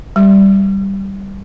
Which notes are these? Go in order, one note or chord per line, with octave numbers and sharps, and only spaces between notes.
G3